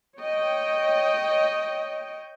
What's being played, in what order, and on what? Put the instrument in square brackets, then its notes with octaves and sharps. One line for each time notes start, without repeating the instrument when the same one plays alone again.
[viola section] C#5 D#5 G5